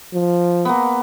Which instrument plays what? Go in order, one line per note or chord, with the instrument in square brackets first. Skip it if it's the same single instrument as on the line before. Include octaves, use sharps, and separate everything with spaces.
[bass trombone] F3
[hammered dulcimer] A#3 B3